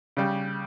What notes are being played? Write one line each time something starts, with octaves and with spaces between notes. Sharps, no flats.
C#3 G3